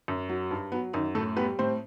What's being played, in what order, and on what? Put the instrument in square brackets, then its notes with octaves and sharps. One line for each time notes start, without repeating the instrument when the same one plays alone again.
[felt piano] F#2
F#3
G2
F#3 B3
F#2 D#3 D#4
A2 A3 A4
G3 B3 B4
A2 C4 C5